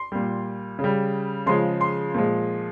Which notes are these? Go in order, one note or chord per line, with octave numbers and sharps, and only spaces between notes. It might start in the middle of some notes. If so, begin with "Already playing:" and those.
Already playing: C6
A#2 G3
C#3
G3
C#3 F3 G#3 C6
C6
A#2 F3 G#3